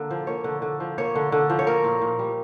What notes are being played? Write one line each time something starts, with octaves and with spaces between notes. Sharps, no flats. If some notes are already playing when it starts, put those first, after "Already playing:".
Already playing: D3 A#3
F3
A#3 C#5
D3
D3
F3
A#3 C#5
D3
D3
F3
C#5
A#3 A#4
A#2
A#2
G3